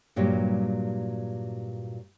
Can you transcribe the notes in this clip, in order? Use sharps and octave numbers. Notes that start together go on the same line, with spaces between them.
G2 A#2 F#3 G3